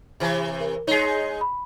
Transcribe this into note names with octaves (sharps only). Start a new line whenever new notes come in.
C3 E3
A#4
G#3 D#4 C#5 C7
B5